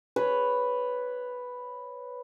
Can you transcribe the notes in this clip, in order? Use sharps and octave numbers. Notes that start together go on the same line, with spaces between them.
B4 C#5